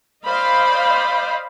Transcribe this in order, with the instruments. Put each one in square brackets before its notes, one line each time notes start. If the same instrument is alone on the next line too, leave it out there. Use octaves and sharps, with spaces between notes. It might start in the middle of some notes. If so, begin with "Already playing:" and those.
[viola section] C5 D5 D#5 F5 B5